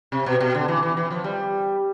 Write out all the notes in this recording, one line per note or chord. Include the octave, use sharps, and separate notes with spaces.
C3
B2
B2
D3
E3
E3
E3
F3
G3